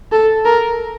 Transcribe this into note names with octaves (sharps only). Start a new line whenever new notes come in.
A4
A#4